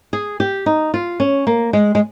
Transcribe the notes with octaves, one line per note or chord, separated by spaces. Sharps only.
G#4
G4
D#4
F4
C#4
A#3
G#3
G#3